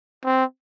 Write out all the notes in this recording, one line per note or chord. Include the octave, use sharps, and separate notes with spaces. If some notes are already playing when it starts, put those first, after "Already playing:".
C4